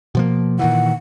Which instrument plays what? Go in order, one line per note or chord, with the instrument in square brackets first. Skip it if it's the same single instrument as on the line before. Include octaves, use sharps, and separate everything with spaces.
[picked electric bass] B2 F3 A#3
[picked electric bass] A#2 D#3 E3 [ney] F#5